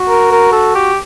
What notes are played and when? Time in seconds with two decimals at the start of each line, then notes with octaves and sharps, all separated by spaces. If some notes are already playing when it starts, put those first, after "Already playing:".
Already playing: F#4
0.09 A#4
0.31 A#4
0.52 A4
0.75 G4